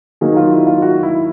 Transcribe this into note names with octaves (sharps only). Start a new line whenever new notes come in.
D#3 F#3 A#3 D#4 G#4
F4
E4
F4
F#4
E4